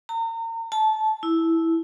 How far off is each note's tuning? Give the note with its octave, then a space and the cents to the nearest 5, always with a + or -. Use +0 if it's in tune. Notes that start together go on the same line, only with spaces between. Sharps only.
A#5 -35
A5 -20
E4 -5